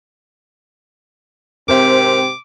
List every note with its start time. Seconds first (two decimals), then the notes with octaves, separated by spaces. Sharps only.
1.69 G#2 C3 C4 A#4 C5 E5 D6